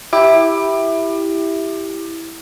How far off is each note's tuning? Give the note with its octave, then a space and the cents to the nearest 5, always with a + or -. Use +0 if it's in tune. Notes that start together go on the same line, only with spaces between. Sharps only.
E4 -5 G4 +0 D6 +25